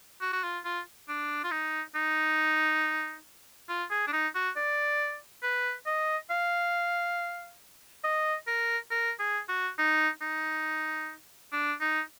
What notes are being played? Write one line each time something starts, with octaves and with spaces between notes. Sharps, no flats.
F#4
F#4
F4
F4
D4
F4
D#4
D#4
F4
G#4
D4
D#4
F#4
D5
B4
D#5
F5
D#5
A#4
A#4
G#4
F#4
D#4
D#4
D4
D#4